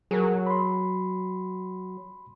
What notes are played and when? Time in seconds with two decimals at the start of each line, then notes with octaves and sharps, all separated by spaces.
0.11 F#3 G#4 A#4
0.47 B5 C6